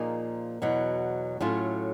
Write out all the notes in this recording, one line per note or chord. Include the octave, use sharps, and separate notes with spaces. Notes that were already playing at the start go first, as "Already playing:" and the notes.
Already playing: A#2 F3 A#3 D#4 G#4
E2 B2 F#3
A2 F#3 A3 C#4 F4